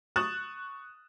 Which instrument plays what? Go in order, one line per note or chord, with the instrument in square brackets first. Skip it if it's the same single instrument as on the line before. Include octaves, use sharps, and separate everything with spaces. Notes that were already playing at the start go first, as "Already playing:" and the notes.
[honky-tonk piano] C#6 D#6 F#6 A6 E7 F#7